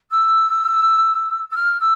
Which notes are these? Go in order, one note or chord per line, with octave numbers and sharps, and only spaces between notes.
E6
E6
F6
E6